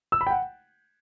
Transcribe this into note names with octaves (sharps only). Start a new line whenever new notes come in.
E6
B5
G5
F#5